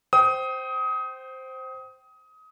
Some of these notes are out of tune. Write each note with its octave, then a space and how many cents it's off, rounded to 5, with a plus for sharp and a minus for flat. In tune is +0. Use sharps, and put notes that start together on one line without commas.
C5 +0 G5 -25 D#6 +25